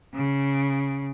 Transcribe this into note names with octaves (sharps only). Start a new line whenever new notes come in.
C#3